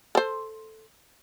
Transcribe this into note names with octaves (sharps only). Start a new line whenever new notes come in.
A4 C5